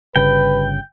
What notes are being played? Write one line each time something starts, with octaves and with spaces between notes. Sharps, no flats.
G1 C#3 G3 B4 G5